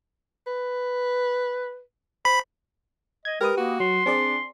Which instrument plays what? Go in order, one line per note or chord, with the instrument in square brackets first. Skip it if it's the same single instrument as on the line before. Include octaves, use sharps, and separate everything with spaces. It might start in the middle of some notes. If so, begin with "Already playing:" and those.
[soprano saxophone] B4
[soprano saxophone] C5 [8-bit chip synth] B5
[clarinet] D#5 [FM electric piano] G#6
[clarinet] G#3 [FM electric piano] G4 B4 D#6 [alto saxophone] A#4
[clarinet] A#3 [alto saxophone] F#4
[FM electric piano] F#3 [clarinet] C6
[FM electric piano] C4 G#4 D5 [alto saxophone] D4